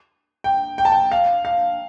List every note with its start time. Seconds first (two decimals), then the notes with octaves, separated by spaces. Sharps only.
0.44 G5
0.78 G5
0.85 A5
0.92 G5
1.12 F5
1.45 F5